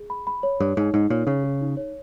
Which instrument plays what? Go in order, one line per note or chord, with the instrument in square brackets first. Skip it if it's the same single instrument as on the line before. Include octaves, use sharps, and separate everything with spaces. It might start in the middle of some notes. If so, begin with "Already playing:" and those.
Already playing: [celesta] G#4
B5
B5
C#5
[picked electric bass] G2 [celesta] C#5
[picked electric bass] G#2 [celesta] D#4
[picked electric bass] G#2 [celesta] D#4
[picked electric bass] A#2 [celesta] C#5
[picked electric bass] C#3 [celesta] C#5
[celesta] G#4
D#4
C#5